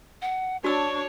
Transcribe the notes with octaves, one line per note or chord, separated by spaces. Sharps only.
F#5
D4 F#4 C#5 C#6 E6